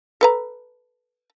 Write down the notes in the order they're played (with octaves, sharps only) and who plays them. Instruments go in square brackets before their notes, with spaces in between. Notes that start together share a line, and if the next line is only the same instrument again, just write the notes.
[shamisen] A4 B4 A#5